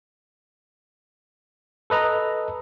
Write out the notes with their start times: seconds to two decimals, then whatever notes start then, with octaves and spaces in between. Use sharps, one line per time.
1.90 A4 B4 D#5 A#5